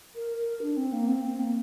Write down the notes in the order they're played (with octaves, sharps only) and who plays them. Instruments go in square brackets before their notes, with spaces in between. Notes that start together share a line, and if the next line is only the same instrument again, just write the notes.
[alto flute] A#4
A#4
D4
C4
A#3
C4
C4
A#3